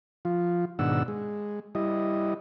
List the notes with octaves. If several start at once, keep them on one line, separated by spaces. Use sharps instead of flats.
F3 F4
G#2 B2 D#3 D4 F#5 E6
G#3
G3 E4 D#5